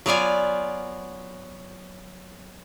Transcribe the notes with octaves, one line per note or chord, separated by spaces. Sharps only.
F#3 B3 F4 D5 G#5